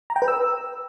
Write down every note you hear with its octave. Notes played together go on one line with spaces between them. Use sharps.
A#5
G5
B4
E6